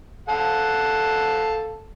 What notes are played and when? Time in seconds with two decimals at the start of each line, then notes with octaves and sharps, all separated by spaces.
0.29 A4 F5 F#5